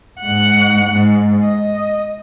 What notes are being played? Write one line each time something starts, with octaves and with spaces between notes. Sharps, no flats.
G#2 F#5
G#2
D#5